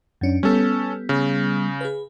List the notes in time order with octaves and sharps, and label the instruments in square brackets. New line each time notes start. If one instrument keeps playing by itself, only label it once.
[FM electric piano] F#2 C#4 D4
[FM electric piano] G3 B3 [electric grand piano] C#4 A4
[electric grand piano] C#3
[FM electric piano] G#4 B4